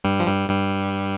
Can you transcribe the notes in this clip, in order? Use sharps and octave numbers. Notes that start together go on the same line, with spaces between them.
G2 G3
F3
G2 G3
G2 G3